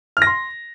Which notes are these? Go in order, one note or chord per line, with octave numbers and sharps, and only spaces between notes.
F6
A#6
C6